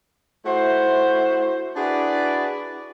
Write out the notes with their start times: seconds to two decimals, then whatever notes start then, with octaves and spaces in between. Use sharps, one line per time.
0.46 A3 E4 F#4 C5
1.76 D4 E4 F#4 G#4 B4 D5